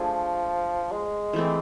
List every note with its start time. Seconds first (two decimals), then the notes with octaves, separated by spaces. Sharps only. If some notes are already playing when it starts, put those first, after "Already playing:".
Already playing: F3 A3 D4 G#4
0.92 G#3
1.33 E3 A3 C4